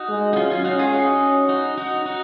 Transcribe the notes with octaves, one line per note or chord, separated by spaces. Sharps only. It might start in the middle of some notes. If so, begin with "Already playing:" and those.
Already playing: D#4 F#4
G#3
D#4
F#3 C#4 F4
C#4 F4
C#4 D#4 F#4
F4 G#4
D#4 F#4
D#4 F#4
D#4 F#4
D#4 F#4